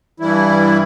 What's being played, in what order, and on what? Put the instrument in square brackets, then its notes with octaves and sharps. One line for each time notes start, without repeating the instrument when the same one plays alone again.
[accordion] G2 E3 G3 E4